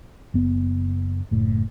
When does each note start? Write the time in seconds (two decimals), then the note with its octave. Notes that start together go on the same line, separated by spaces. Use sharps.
0.34 F#1 B3
1.31 F#1 A2